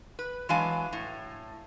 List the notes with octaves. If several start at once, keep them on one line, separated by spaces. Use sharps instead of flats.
B4
E3 F#3 G#3 D4 F5 G#5
A2